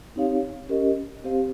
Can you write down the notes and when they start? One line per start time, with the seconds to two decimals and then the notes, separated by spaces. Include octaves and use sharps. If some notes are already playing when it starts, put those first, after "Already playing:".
0.16 C4 D#4 G4 C#5 F5
0.69 C#4 G4 A#4 D#5
1.24 C4 G4 C5 F5